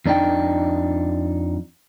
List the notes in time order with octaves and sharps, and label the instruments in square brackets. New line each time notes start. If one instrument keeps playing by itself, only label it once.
[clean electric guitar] F2 D4 D#4 G5